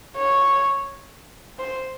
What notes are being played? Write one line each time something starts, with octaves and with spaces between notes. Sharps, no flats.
C#5
C5